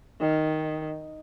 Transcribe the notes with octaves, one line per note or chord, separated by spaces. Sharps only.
D#3